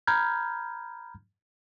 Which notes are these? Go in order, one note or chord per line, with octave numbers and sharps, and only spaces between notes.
A#5 B5 F6 G6 G#6